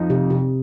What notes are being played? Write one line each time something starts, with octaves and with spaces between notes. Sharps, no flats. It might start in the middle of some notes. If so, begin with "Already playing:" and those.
Already playing: F2 F3 D#4
C3
C3